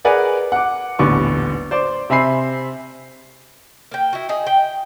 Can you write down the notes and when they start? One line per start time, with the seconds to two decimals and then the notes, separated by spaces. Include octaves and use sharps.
0.05 G#4 A#4 B4 D5 F#5 G#5
0.52 F#5 D6
0.99 D#1 A1 D3 B3 C#6 D6
1.71 C5 D5 D6
2.10 C3 C4 E5 G#5 B5 C7
3.91 A#3 G5
4.13 E4 F#4
4.29 D#4 G#4
4.47 G5